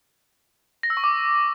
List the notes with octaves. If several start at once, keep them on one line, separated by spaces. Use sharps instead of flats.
A#6
E6
C#6
D6